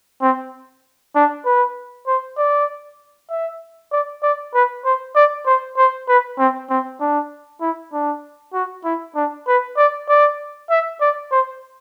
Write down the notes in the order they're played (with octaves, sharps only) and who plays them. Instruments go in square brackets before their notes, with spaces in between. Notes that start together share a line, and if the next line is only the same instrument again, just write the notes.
[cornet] C4
D4
B4
C5
D5
E5
D5
D5
B4
C5
D5
C5
C5
B4
C4
C4
D4
E4
D4
F#4
E4
D4
B4
D5
D5
E5
D5
C5